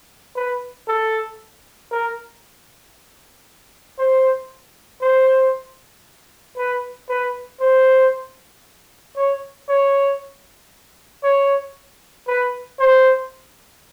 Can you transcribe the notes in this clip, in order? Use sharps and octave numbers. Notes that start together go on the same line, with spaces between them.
B4
A4
A#4
C5
C5
B4
B4
C5
C#5
C#5
C#5
B4
C5